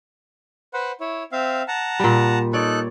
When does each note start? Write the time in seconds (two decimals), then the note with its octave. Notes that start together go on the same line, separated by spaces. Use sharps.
0.74 B4 C5 F#5
1.00 E4 C#5
1.32 C4 E5 F5
1.68 F#5 A5 A#5
1.99 A#2 G3
2.53 D#4 A4 C#5 D5 F#6